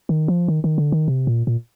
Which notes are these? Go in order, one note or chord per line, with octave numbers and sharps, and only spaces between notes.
D#3
F3
D#3
D#3
D3
D#3
C3
A#2
A#2